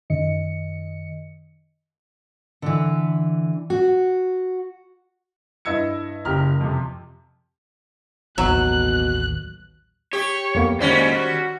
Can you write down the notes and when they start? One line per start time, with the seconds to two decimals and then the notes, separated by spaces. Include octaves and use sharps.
0.10 F#2 D#3 D#5 C#7
2.62 D3 E3
3.70 F#4
5.65 G2 E4 D#5 E6 G#6 C#7
6.25 F#1 G4 A#5 F6
6.60 F2 C3
8.38 A1 D#2 B2 F#3 F#6
10.13 G4 C#5
10.55 F2 A#3 B3
10.80 A#2 D#3 G3 G#3 C#4 F#4 C5
11.14 F#4